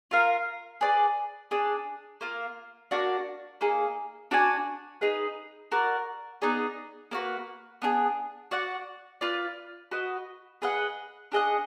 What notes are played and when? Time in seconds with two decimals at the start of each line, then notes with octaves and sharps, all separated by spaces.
0.11 F4 A#4 F5
0.81 G#4 B4 D5
1.51 D4 G#4 D5
2.21 A#3 F4 A#4
2.91 A#3 D4 F#4 D5
3.61 A#3 D#4 G#4
4.31 D4 F#4 D5 G#5
5.01 D#4 G#4 B4
5.72 F#4 A#4 D5
6.42 B3 D#4 G#4 D5
7.11 A#3 D4 F#4 B4
7.82 B3 D4 F4 G#4
8.51 F#4 D5 F#5
9.21 F4 B4 D5
9.91 F#4 B4 D#5
10.62 G#4 B4 D#5 F#5
11.32 D4 G#4 D#5 F#5